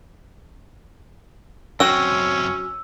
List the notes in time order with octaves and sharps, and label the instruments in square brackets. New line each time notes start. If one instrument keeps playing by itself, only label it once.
[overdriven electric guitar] F#2 C4 [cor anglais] C#4 [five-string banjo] F#4 G5 [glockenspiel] E6